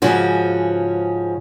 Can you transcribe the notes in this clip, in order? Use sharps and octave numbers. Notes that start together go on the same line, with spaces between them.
G#2 C#3 F3 C#4 F#4